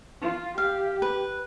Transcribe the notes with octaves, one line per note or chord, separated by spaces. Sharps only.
F4
G4 F5
B4